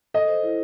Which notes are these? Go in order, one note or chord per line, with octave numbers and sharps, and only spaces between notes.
A4 D#5
C5
E4